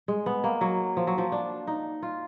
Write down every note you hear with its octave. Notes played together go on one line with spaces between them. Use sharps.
G#3
B3
A#3
F#3
F3
F#3
F3
D4
D#4
F4